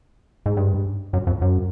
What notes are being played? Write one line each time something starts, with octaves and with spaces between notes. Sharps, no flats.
G#2
G2
F#2
F2
F#2